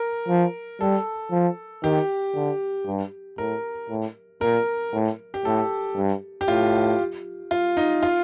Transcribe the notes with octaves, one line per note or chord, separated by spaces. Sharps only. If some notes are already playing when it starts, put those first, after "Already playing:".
Already playing: A#4
F3
G3 A4
F3
D#3 G4
D3
G2
A2 A#4
A2
A#2 A#4
A2
G4
A2 A4
G2
G4
A2 F4
F4
D#4
F4